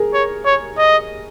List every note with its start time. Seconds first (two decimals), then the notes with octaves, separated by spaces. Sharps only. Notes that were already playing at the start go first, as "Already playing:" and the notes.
Already playing: G#4 A#4
0.14 C#5
0.45 C#5
0.78 D#5